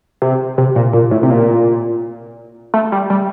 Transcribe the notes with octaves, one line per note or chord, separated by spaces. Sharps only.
C3
C3
A#2
A#2
A2
C3
A#2
A3
G3
G3